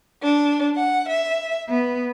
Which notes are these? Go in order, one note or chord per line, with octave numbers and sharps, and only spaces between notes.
D4
F#5
E5
B3